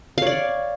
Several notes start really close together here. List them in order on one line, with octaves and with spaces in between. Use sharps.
F5 C#5 D5